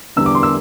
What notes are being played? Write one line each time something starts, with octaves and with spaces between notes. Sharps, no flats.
E2 D3 G3 D4 E6
D6
C6
E6